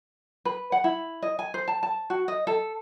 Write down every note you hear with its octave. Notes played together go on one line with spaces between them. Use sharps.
B4
F#5
E4
D#5
G#5
C5
A5
A5
F#4
D#5
A4